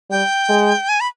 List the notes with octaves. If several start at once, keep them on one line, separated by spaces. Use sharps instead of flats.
G3 G5
G#3
G#5
B5